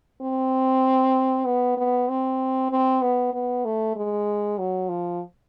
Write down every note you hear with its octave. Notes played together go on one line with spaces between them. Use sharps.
C4
B3
B3
C4
C4
B3
B3
A3
G#3
F#3
F3